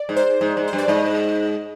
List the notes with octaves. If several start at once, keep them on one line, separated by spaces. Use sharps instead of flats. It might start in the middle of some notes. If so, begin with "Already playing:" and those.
Already playing: D5
G#2
C5
G#2
G#2
C5
G2
D5
G#2 D#5